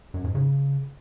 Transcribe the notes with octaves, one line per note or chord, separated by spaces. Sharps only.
F#2
G#2
C#3